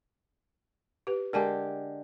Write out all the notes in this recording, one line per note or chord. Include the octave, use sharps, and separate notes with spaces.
G4 B4
D3 G#3 G4 A#4 G#5 A5